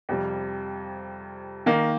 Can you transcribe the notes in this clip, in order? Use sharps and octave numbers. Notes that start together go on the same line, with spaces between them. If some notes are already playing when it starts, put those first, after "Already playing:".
F2 C3 G3
D#3 A#3 D#4